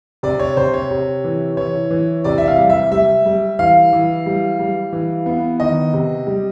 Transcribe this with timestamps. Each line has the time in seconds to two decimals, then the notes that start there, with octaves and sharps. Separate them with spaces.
0.23 C3 D5
0.39 C#5
0.57 C3 C5
0.74 C#5
0.91 C3
1.24 E3
1.57 E3 C#5
1.91 E3
2.24 C3 D5
2.38 E5
2.47 F5
2.58 G3
2.70 E5
2.92 G3 E5
3.26 G3
3.59 E3 F5
3.93 E3
4.26 G3
4.59 G3
4.93 E3
5.26 B3
5.60 D#3 D#5
5.93 C3
6.27 G3